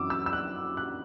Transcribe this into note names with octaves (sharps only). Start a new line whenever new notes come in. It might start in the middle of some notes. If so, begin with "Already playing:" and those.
Already playing: F#2 E3 C4 E4 D6 E6
E6
E6
F#6
F#6